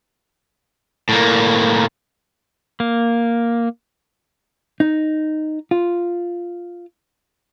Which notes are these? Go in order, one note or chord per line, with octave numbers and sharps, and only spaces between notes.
A2 A#3
A#3
D#4
F4